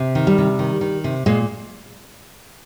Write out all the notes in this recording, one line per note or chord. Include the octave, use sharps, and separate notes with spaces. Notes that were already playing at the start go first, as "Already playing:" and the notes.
Already playing: C3
D#3
G3
C3
D#3
D#3
C3
A#2 G#3